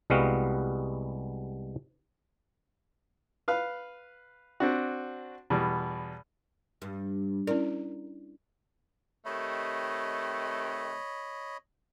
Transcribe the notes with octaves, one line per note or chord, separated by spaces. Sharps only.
C2 G3 G#3 B3 F#4 F5
B4 F5
C4 D4 F#4
E2 B2 G3
G2
C#4 E4 A#4 D5
C3 D#3 A3 C#5 D#5 B5